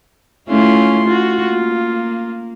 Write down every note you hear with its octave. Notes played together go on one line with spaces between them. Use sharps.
A3 C#4 E4 F4 C6
F4 F#4
A#3